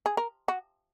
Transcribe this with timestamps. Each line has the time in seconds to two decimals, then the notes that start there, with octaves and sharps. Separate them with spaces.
0.06 G#4
0.17 A#4
0.48 F#4